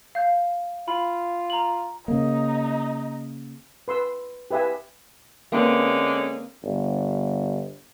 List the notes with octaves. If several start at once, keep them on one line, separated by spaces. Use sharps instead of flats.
F5 G6
F4 B5
A#5 F#7
C#3 A#3 D#4
B4 C6 E6
G4 B4 E5 F5 G#5
D3 G#3 A#3 C4 C#4 B4
G1